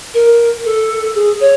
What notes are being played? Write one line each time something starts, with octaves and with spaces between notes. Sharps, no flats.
A#4
A4
G#4
C#5